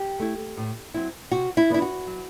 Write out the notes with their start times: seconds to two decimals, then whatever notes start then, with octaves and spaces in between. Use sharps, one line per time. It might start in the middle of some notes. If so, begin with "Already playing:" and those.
Already playing: G4
0.20 A3 E4
0.57 A2
0.94 F#3 C4 E4
1.31 C3 F#4
1.57 E4
1.70 E3 B3 D4 E4
1.82 F#4
2.07 F#3